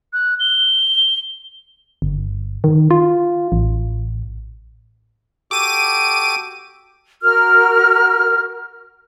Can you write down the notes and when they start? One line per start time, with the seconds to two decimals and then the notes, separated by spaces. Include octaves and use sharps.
0.13 F#6
0.40 G7
2.02 G1
2.64 D#3
2.91 F4
3.52 A1
5.51 F#4 G4 A4 D6 D#7
7.23 F#4 A#4 F6